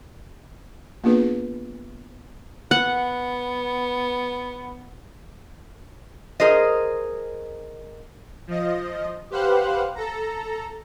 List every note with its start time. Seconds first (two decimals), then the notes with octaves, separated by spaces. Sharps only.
1.04 A#3 B3 D4 F4 G#4 B4
2.71 B3 F#5
6.40 G#4 A#4 C5 D#5
8.47 F3 D#5
9.30 G4 B4 C5 F5 F#5 F#6
9.95 A4 A#5